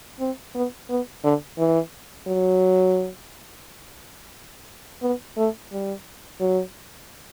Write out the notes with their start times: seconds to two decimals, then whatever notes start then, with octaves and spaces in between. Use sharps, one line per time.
0.20 C4
0.55 B3
0.89 B3
1.24 D3
1.58 E3
2.27 F#3
5.02 B3
5.37 A3
5.72 G3
6.40 F#3